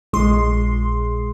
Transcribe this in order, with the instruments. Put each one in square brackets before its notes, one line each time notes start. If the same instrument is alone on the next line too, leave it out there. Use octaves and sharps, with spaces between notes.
[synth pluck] A#1 G#3 C6